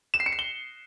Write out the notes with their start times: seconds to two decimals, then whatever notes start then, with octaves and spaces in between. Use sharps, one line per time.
0.14 E7
0.20 C7
0.26 C#7
0.32 C7
0.39 G7